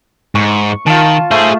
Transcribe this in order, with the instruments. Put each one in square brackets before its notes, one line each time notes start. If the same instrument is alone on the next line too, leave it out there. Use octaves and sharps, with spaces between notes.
[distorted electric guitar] G#2 [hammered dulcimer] C#6
[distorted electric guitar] D#3 [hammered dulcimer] F4 A5
[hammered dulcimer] A3 [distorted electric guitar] G#4 C5